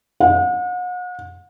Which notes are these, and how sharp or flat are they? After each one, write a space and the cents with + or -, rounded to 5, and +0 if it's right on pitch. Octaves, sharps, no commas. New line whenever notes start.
F#5 -40